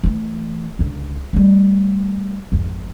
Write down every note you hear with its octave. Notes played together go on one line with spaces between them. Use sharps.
E3 A3
C#2 D3
G3 A3
G#1 F2